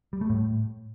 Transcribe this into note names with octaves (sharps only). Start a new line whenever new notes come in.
G3
A3
A2